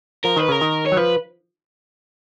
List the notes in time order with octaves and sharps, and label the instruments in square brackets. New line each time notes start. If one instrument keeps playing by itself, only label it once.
[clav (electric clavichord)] F3 [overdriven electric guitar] A#4
[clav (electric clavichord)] D#3 [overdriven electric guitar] B4
[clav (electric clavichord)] C#3 [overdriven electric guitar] A#4
[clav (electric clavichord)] D#3
[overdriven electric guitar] C#5
[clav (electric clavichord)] F#3
[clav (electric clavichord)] F3 [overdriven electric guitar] B4